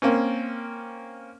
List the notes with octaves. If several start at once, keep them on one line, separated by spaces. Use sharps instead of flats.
A#3 C4 C#4